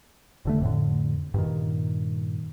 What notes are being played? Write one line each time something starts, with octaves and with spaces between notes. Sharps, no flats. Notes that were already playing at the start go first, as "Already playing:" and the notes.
F1 D3 A3
F2 A2 D3
G2 A#2 D#3